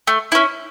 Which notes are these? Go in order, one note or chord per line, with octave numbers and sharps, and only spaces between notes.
A3
C#4 E4